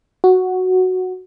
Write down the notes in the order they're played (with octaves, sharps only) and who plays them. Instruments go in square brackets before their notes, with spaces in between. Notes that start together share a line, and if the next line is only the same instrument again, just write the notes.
[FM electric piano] F#4